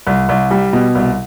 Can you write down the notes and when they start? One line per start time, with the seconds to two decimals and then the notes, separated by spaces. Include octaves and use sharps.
0.07 C2
0.29 C2
0.51 G3
0.73 B2
0.95 C2